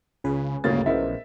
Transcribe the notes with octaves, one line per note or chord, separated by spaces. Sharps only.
C#2 C#3 G#4 B4
D1 G1 D2 C#3 A#3 A6
A#1 C#3 E3 B3 A#4 C5 D#5 E5